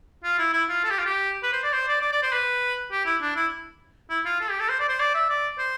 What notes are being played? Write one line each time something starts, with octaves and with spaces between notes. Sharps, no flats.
F4
E4
E4
F4
A4
G4
F4
G4
B4
C5
D5
C5
D5
D5
D5
C5
B4
G4
E4
D4
E4
E4
F4
A4
G4
A4
C5
D5
C5
D5
E5
D5
C5